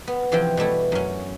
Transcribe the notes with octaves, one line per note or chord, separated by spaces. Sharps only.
B3
C3 E3 F3 C4 G5
B2 G3 A3 E4
F#2 C#4